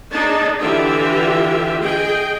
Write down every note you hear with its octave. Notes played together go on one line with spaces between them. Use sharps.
D4 D#4 G#4 A5
D3 E3 F4 G4 E5
G#4 D#5 G5